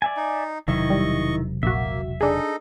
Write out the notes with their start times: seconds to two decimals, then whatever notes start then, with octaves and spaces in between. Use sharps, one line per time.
0.02 D5 E5 G#5
0.17 D#4
0.68 E1 C3 D#3 F#3 E4 D#5 C#6
0.90 G3
1.63 A#1 A#3 F#4 E5
2.21 D4 D#4 G#4 A4 D#5